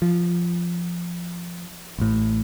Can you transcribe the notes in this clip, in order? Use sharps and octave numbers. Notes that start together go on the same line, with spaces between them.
F3
A1 A2